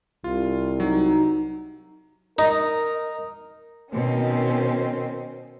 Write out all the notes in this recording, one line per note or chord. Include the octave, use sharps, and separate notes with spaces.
C2 F4
F#3 D#4
D#4 A#4
B2 D#3 C4 C#4